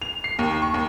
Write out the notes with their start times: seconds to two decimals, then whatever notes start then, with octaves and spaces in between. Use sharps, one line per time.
0.02 F7
0.24 C7
0.39 D#2
0.62 C#6
0.74 D#2